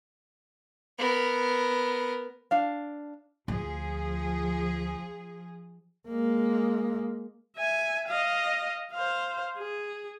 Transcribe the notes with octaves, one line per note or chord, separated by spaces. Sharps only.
B3 A#4
D4 F5
D2 F3 G#4
G#3 A#3
E5 G#5
D#5 F5
C5 F5
G#4